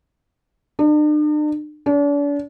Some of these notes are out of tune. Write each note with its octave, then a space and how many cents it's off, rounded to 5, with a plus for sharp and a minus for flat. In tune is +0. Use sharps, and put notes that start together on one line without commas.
D4 +45
D4 -40